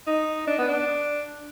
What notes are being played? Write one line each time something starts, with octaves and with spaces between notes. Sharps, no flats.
D#4
D4
B3
D4